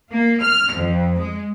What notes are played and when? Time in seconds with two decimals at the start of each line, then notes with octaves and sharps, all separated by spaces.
0.11 A#3
0.42 F6
0.72 F2
1.18 G#3